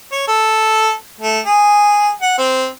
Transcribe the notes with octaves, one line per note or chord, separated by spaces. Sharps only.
C#5
A4
A3
G#4
F#5
C4